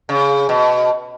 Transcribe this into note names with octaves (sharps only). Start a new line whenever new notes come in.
C#3
B2